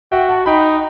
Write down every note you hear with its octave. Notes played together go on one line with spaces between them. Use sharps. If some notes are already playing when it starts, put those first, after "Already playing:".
F#4 E5 G5
F#5 A5
D#4 G5 B5